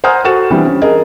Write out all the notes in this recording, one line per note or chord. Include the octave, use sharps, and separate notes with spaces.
C5 F#5 G#5 A#5 D#6 F6
F#4 A4 F#5 A6 E7
E3 G3 C4 D4
C#4
G#4 A#4 D#5